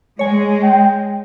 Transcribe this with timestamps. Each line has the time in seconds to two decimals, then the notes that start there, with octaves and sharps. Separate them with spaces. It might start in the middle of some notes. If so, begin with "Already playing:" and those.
0.19 G#3 C#5 G#5
0.63 G5